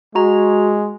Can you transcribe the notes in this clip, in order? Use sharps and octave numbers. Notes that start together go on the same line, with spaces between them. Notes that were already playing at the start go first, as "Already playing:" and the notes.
G#3 F#4 A#5